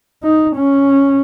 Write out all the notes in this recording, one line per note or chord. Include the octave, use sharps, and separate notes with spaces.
D#4
C#4